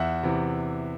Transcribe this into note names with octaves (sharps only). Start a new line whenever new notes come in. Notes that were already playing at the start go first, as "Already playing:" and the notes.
Already playing: E2 E5 F#5
C3 E3